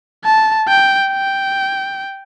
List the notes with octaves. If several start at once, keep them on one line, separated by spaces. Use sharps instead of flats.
A5
G5
G5